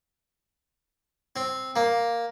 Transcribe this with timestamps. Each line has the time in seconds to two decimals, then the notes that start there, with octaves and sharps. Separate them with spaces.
1.36 C4
1.76 A#3